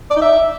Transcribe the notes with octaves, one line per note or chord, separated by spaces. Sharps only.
D5
D#4
E5